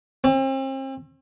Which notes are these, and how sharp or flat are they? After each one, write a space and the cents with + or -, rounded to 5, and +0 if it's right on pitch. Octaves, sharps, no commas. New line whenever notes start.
C4 +40